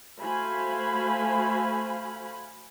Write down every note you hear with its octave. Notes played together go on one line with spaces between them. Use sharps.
A3 F#4 C5 F5 G#5 B5